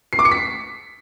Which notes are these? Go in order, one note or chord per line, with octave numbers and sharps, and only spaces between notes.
C7
D6
C#7
B6